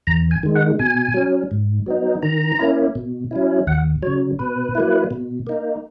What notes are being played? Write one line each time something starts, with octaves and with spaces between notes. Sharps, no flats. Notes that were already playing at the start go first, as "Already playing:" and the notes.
E2 A#5
G#5
D#3 G#3
F#5
B2 G#5
F#3 C#4
G#2
F#3 B3 D#4
D#3 A#5
A#3 C#4 E4
B2
F#3 C#4 E4
D#2 F#5
C#3 F#3 C#5
B2 B4
F#3 A#3 E4
B2
A#3 D#4